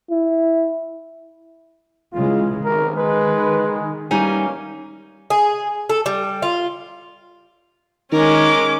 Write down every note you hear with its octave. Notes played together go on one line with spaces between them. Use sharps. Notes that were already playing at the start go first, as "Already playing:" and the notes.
E4
C#3 E3 G#3 F4
B1 C3 D#3 A#4
G#3 B4
E3 G3 A#3 C#4 D#4 G#5
G#4
A4
G3
F4
D#3 G#3 C#4 A#4 D6